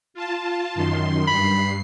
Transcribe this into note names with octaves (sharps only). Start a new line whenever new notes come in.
F4 A5
F#2 D#3 C6
G2 B5 C7